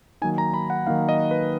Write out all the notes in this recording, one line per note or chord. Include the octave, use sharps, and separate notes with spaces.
D#3 F#3 A#3 D#4 G#5
A#5
B5
F#5
D#3 F#3 A#3 D#4 F5
D#5
B4